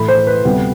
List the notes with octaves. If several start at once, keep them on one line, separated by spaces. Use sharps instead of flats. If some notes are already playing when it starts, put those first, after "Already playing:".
Already playing: A2 E3 A3 B5
C5
B4
D2 C3 G3 B3